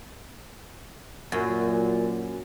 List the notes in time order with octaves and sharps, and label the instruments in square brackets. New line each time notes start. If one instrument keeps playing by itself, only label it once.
[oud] F#2 [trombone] A#2